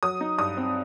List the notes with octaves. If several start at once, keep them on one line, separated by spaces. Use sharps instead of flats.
F#3 D#6
D#4
G2 D#6
C4